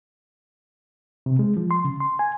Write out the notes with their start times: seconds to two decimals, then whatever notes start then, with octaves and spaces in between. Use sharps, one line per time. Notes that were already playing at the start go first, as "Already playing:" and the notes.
1.26 C3
1.39 G#3
1.57 F3
1.71 C6
1.85 C#3
2.00 C6
2.19 G#5